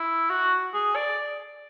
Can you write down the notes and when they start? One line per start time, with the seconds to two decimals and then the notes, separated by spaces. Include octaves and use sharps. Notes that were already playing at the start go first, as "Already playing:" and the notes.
Already playing: E4
0.30 F#4
0.74 G#4
0.96 D5